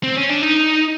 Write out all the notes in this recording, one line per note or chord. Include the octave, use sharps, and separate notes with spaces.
C4
C#4
D4
D#4